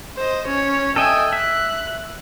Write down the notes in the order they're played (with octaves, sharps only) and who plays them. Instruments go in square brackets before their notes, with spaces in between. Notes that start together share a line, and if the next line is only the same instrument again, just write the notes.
[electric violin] C5 D#5
C#4 C#5
[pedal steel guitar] A4 D#5 E5 [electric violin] G5 G#5
[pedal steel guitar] E5 [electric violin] F#6